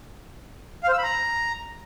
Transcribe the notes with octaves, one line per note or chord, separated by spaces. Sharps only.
F5
C5
E6
B5
A#5